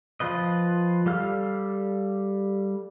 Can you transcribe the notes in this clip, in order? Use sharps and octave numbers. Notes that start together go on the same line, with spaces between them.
F3 F4 B4 D#5
G3 A4 F5 F6